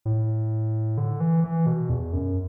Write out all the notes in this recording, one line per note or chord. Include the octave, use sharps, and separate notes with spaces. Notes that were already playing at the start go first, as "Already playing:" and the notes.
A2
D3
E3
E3
B2
E2
F#2